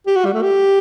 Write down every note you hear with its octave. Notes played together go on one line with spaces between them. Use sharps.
G4
F#4
G3
A3
G4